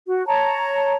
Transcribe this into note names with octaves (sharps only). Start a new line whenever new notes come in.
F#4
C#5 A5 A#5